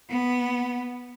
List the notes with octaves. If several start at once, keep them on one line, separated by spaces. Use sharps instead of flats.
B3